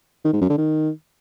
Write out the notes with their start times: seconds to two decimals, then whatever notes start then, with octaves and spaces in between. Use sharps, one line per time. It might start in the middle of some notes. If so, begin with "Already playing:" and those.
0.25 D#3
0.33 G#2
0.41 F#2
0.50 D3
0.58 D#3